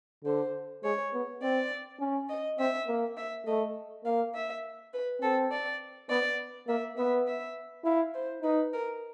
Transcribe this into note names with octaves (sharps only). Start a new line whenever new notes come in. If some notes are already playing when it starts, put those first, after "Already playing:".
D3 C5
G#3 C#5
B3
C4 D5
C#4
D#5
C4 E5
A#3
E5
A3 D#5
A#3 F5
E5
B4
C4 A4
D5
B3 D5
A#3 E5
B3 E5
E5
E4 F5
C5
D#4 B4
A#4